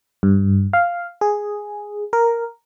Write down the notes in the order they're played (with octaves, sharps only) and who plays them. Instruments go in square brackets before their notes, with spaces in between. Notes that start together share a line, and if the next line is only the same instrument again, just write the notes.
[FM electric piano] G2
F5
G#4
A#4